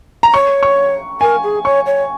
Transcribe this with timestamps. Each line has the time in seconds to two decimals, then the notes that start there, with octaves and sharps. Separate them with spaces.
0.23 A#5
0.34 C#5 C#6
0.63 C#6
1.21 A#4 G#5
1.43 G#4
1.65 C#5 C#6
1.86 C#5